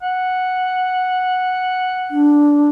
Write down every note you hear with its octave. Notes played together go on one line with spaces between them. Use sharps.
F#5
D4